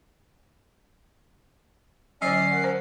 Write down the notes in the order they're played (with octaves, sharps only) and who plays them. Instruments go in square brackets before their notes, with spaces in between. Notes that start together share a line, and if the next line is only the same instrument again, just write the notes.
[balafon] D3 F#3 [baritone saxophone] C#4 [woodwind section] D5 [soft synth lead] C7
[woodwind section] A#4 F#5
[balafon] C5